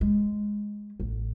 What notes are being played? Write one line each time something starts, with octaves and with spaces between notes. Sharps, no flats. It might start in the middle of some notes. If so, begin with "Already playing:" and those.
G#3
A1